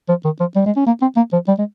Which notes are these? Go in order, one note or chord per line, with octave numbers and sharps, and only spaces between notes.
F3
D#3
F3
G3
G#3
C#4
A#3
C4
A#3
F3
G3
G#3